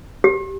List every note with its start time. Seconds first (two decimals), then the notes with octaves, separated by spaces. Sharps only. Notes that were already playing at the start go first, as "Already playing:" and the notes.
0.24 G4